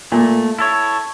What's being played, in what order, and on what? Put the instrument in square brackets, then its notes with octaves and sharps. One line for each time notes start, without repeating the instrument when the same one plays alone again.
[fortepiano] A#2 [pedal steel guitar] A3
[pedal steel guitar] E4 A4 C#5